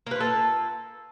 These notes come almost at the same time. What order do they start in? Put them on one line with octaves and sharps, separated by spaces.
A#3 B4 F4 A4